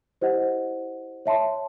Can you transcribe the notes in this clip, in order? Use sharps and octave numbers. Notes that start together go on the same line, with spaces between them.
E4 G4 C5 D#5 F#5
C#5 E5 A5 C6